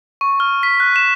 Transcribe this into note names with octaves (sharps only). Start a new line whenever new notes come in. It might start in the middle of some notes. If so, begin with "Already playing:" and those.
C#6
F6
B6
F#6
E7